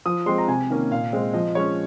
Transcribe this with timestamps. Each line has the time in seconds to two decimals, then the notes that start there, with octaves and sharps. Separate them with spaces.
0.06 F3 D#6
0.26 G#3 C4 C6
0.38 A#5
0.48 C3 G#5
0.70 D#3 A#3 C#4
0.91 A#2 F5
1.13 G#3 C4
1.34 F3 D#5
1.55 G#3 C#4 C#5